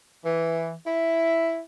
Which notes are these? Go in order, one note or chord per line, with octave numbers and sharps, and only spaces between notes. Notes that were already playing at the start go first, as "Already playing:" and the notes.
E3
E4